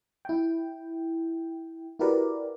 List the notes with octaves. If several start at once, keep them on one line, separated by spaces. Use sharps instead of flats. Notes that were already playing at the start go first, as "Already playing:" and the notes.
E4 G5
E4 F#4 G4 A#4 B4 D5